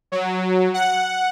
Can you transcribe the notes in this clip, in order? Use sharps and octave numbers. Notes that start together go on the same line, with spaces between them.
F#3
F#5